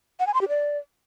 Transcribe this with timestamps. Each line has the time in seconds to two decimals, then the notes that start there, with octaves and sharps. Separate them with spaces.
0.20 F#5
0.27 G#5
0.34 C6
0.41 G4
0.49 D5